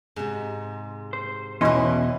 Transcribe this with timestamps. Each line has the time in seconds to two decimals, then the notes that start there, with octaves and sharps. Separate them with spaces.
0.16 G#2 C3
1.13 C5
1.61 E2 B2 E3 C#4 E4 B4 D#5 C6